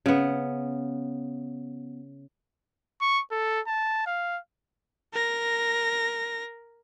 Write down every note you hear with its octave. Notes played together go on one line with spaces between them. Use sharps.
C#3 B3
C#6
A4
A5
F5
A#4 A#6